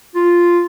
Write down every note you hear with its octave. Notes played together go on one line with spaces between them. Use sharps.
F4